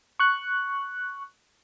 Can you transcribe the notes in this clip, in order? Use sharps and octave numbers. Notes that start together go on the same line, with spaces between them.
C#6 F#6